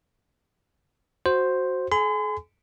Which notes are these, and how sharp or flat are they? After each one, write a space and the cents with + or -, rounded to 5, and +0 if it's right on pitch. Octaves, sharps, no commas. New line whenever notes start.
F#4 +0 C5 +0
G#4 +45 G#5 +0 C6 -45